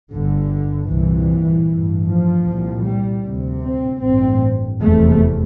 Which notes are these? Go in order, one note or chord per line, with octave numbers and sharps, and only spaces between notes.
G1 G2 D3
C2 A#2 E3
A1 G2
F3
C2 A#2
G3
D2 C3
C4
A1 G2 C4
F1 E2 C3 A3